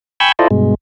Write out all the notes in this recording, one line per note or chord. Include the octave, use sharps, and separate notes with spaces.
G5 G#5 B5 C#6 E6 G6
E4 F4 A4 C5 D5 D#5
G2 B2 G#3